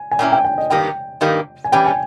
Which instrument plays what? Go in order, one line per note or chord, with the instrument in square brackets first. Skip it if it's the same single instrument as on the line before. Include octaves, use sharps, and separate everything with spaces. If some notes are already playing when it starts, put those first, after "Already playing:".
Already playing: [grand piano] G#5
G#5
[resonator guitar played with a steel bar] A#2 A#3 C#4 E4 [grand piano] G5
[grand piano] G5
G5
D#5
[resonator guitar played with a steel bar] G2 D#3 A#3 D#4 G4 [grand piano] G5
[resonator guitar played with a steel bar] G2 D#3 A#3 D#4 G4
[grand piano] G#5
[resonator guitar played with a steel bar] E3 G3 C#4 G4 [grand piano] G5
[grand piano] G#5